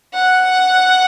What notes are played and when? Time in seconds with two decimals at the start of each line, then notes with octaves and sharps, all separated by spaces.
0.14 F#5